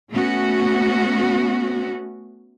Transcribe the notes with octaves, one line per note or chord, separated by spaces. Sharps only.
A3 B3 C#4 F#4